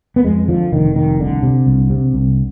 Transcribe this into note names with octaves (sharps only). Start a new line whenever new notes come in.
B3
F2 G#3
D3 F3
F1 D#3
F1 D#3
C2 D3
C3
C2
C3
C2